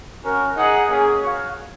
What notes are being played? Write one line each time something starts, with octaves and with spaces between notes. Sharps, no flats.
C#4 F#4 A#4
D#4 G#4 D#5 F#5
A#3 C#4 G#4
F#4 C#5 F5